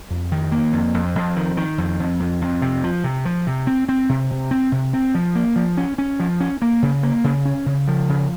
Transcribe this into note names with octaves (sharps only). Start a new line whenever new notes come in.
F2
D#3
A#3
F2
F2
F2
D#3
D#3
F2
F2
F2
F2
C3
F3
C3
F3
C3
C4
C4
C3
C3
C4
C3
C4
F3
A#3
F3
C#4
C#4
F3
C#4
A#3
C#3
A#3
C#3
C#4
C#3
F3
C#3